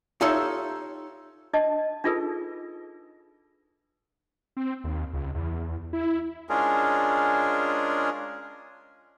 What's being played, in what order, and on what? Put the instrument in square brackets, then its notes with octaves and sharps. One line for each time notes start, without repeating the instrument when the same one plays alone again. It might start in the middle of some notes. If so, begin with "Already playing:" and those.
[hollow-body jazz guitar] D#4 F4 G4 A4 C#5 E5
[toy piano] D4 D#5 A5
D4 D#4 F4 G#4 A4 B4
[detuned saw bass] C4
D#2
C#2
E2
E4
[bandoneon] G#3 C#4 D4 F4 G#4 A#4